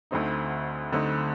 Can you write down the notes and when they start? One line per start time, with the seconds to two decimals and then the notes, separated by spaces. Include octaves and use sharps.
0.11 D2 D3 A3 C4 D#4
0.92 D2 D3 A3 C4 D#4